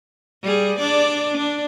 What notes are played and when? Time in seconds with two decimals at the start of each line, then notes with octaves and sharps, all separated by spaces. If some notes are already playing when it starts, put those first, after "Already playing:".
0.42 G3 G#4
0.79 D4 D5
1.37 D4